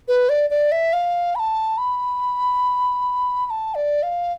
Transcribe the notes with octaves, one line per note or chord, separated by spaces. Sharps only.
B4
D5
D5
E5
F5
B5
A5
B5
B5
A5
D5
F5